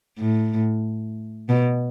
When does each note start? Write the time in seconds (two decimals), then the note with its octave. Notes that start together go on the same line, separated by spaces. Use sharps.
0.18 A2
1.49 B2